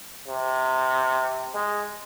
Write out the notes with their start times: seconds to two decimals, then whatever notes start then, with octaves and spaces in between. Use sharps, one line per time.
0.28 C3
1.55 G#3